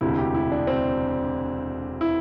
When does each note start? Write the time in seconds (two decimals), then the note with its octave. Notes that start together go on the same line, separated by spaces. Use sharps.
0.01 E1 D2 C3 E4
0.18 G4
0.34 E4
0.52 D4
0.67 C4
2.01 E4